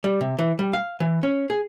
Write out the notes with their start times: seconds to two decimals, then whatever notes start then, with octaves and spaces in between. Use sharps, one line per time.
0.04 G3
0.21 C3
0.39 E3
0.59 G3
0.73 F5
1.00 E3
1.23 C#4
1.50 G#4